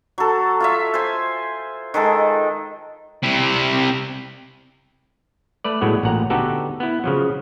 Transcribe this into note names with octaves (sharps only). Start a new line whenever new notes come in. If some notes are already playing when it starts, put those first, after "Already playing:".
F#3 A4
F4 C#5 E5
C5 G#5
D#3 G#3 A4
C3 E4
A3 B4 D5
A2 F#3 G#3 B3
A1 A#2 F#5 A#5
D3 B3 D#4 F#4 G4 A4
B3 E4
C#3 F3 F#3